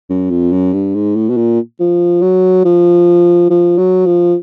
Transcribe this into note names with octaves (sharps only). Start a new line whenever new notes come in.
F#2
F2
F#2
G2
G#2
A2
B2
A#2
F3
F#3
F3
F3
F#3
F3